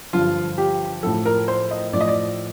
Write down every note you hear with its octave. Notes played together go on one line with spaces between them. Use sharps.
G2 D3 F3 F4
G4
A2 F3 A4
A#4
C5
D#5
A2 F3 D5
D#5
D5